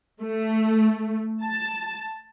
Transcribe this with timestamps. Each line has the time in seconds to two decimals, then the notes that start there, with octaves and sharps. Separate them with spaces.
0.21 A3
1.42 A5